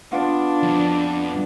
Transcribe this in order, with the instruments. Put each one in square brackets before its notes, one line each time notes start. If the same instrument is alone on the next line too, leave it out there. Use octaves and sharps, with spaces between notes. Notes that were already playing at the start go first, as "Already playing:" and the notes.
[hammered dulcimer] B3 F4 [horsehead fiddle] D4
[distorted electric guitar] F2